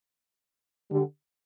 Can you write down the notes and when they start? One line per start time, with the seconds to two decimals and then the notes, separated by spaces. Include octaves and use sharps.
0.91 D3 G3